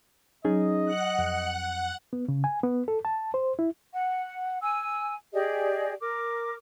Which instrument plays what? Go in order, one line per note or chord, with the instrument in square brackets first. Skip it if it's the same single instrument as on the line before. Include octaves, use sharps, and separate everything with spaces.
[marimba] F#3 [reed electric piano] C#4 D#4 G#4 [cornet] D#5
[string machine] F#5 F#6
[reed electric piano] F2
B3
C#3
G#5
B3
A4
A5
C5
E4
[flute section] F#5
G#5 E6
G4 G#4 D5 D#5
A#4 D6